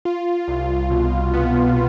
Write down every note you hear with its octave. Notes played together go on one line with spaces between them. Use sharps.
F4
C2
B2
B3